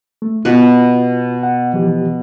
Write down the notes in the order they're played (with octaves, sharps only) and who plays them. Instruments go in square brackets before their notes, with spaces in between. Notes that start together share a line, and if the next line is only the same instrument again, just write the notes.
[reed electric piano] A3
[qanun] B2 B4 [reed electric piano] F4
[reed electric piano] F#5
E3 F3 G4